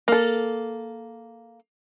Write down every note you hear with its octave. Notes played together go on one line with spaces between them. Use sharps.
A#3 A4